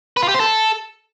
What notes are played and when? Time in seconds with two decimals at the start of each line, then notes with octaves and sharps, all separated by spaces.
0.17 B4
0.23 F4
0.28 G4
0.34 C5
0.40 A4